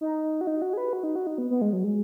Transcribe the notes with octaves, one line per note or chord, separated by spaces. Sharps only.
D#4
F#4
D#4
F#4
G#4
B4
F#4
D#4
F#4
D#4
B3
B3
G#3
F#3
G#3